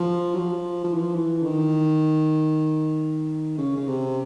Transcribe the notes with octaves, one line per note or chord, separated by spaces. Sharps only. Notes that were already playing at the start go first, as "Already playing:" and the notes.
Already playing: F3
F#3
F3
F3
E3
F3
E3
D3
D#3
C#3
C#3
C3